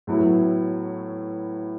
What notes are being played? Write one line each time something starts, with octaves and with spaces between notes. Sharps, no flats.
A2 F#3 B3 E4